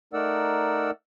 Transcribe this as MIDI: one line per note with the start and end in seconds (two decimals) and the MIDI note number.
0.13 0.91 57
0.13 0.91 63
0.13 0.91 70
0.13 0.91 74
0.13 0.91 78
0.13 0.91 88